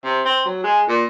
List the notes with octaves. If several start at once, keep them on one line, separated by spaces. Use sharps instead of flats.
C3
C4
F#3
G#3
A#2